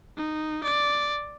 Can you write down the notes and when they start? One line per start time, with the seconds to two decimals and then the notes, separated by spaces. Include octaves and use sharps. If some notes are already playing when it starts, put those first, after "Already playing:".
0.17 D#4
0.63 D5